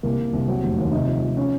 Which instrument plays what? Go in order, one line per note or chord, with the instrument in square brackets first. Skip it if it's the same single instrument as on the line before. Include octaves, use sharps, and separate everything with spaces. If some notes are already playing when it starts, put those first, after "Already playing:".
[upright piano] C2 A#3
C2
C2
F#3 C4
F1
D#2
C3 D#4
F3
F3
C#4